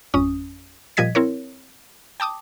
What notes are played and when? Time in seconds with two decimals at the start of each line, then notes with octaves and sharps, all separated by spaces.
0.14 G#1 F2 C#4 D#6
0.97 A#2 F3 G3 D#5 G#6 B6
1.15 C4 E4 A#4 C#5
2.20 G5 A5 D6 D#6